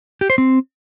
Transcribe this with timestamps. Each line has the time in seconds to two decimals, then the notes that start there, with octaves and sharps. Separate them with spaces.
0.21 G4
0.30 C5
0.38 C4